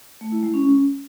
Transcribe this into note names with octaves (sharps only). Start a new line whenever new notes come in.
A3
E4
G#3
C#4